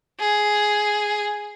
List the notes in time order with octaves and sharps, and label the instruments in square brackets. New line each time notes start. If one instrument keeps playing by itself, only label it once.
[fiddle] G#4